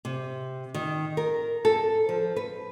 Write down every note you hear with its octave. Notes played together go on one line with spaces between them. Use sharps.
C3
D#3
A#4
A4
F3
B4